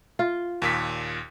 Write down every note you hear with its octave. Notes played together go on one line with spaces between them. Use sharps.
F4
D#2 A#2 B6